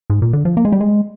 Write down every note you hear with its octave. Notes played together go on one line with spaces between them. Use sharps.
G#2
A#2
D3
F3
A#3
G#3
G3
G#3